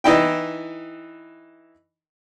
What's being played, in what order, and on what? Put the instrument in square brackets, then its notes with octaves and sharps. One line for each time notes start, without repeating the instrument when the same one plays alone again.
[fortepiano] E3 D#4 E4 G5